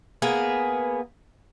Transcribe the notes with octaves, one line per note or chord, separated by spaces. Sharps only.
A#3 B3 G#4